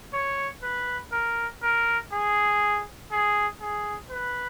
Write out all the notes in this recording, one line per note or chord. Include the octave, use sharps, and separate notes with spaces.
C#5
B4
A#4
A#4
G#4
G#4
G#4
B4